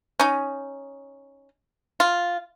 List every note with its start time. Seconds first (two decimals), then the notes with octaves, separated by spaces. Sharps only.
0.19 C#4 D#4
2.00 F4